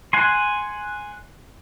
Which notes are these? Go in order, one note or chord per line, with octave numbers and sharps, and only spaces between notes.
F#5 G#5 C6